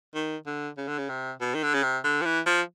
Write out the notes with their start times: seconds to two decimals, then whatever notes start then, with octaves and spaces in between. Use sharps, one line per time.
0.15 D#3
0.46 D3
0.78 C#3
0.88 D3
0.98 C#3
1.09 C3
1.41 B2
1.55 D#3
1.63 D3
1.74 C#3
1.83 C3
2.04 D3
2.22 F3
2.25 E3
2.46 F3